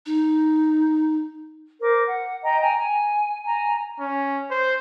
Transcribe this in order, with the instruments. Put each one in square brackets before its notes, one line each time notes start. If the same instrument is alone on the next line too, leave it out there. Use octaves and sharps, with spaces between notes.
[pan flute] D#4
[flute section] A#4 C5 D6
F#5
D#5 G5 A#5
G5 G#5 A#5
G#5
G#5 A#5
[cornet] C#4
C5